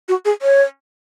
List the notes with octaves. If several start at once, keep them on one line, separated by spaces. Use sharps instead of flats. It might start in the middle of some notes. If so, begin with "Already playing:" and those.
F#4
G#4
C#5